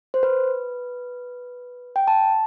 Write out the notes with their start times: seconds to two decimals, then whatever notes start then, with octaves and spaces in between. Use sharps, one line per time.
0.14 C5
0.23 B4
1.96 G5
2.08 A5